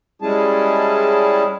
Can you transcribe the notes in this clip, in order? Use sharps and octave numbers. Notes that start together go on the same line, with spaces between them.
G3 G#3 C#4 E4 G#4 A5